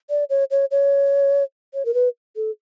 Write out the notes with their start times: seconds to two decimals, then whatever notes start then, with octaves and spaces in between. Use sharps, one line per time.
0.10 D5
0.30 C#5
0.51 C#5
0.71 C#5
1.74 C#5
1.85 A#4
1.94 B4
2.36 A4